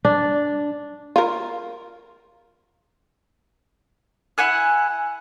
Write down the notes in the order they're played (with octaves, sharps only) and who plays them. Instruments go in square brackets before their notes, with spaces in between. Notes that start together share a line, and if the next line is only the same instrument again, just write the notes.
[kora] D4
[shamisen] F4 A#4
[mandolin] E4 F#5 G#5 F#6